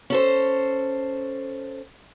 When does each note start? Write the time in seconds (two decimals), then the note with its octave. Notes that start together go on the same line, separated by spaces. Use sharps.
0.10 C#4 A4 C5